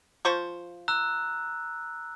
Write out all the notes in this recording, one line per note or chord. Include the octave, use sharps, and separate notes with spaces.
F3 C5 C#6
A#5 E6 F#6